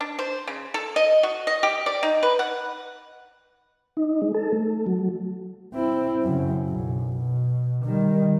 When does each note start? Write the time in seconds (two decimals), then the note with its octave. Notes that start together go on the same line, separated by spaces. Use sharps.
0.01 D4
0.19 C5
0.47 C#3
0.74 A4
0.96 D#5
1.23 F#4
1.47 D#5
1.63 G4
1.86 D5
2.03 D#4
2.23 B4
2.39 F#5
3.97 D#4
4.22 G#3
4.34 A4
4.53 A3
4.87 F#3
5.74 C4 E4
6.23 F#2 C#3
6.66 B1 F#2
7.17 B2
7.85 D#3 G3